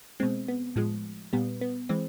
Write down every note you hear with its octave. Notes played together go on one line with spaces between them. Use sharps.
B2 G#3 C4
B3
A2 F3 G#3
A#2 G3 B3
B3
E3 G#3 C4